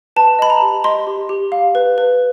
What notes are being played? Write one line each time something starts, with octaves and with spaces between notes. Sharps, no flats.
B4 A5
D#5 B5
A#5
G4
D#5 C6
G4
G4
F5
B4
B4